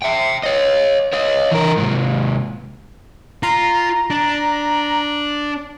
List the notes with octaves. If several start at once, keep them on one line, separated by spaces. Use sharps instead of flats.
E5 G5
C#5 D#5
C#5 D#5
E3 A#4
G#2 C3
F4 A#5
D4